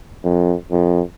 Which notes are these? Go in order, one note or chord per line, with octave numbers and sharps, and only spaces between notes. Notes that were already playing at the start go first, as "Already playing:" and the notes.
F2
F2